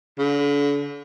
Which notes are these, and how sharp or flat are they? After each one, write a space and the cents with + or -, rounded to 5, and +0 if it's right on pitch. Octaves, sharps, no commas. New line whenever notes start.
D3 -40